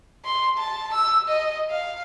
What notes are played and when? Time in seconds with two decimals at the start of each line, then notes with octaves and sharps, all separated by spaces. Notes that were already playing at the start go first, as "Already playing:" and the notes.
0.25 C6
0.58 A5
0.94 E6
1.29 D#5
1.70 F5